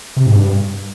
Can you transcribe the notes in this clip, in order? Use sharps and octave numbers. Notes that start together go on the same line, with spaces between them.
C3
G#2
G2